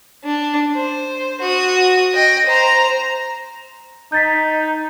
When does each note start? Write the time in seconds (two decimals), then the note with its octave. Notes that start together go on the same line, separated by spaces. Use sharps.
0.24 D4
0.76 C5
1.41 F#4 D#6
2.13 D#5 G5
2.46 C5 A#5
4.12 D#4 G6 A6 B6